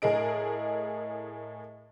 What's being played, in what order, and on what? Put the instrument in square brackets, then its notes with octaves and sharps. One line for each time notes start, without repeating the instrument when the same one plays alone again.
[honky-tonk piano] A2 G#4 A#4 D#5 D7